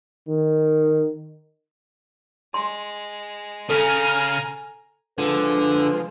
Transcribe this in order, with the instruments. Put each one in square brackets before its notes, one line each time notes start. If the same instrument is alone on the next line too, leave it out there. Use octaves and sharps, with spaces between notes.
[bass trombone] D#3
[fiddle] G#3 [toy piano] C6
[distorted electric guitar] C#3 [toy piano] A4 [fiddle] G#5 A#5 [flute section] F6
[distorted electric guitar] D3 [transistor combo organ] F3 G#3 [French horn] B4